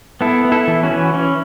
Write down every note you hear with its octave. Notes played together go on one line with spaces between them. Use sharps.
B3 E4 A4
B3
E4 A4
E3
C#4 F#4
E3
E3 C#4